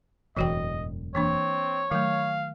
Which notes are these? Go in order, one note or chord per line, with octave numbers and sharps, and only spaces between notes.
E1 F#2 A2 E3 F#4 D#5 G5
E3 A#3 C4 D4 C#5
D#3 F#3 A3 F5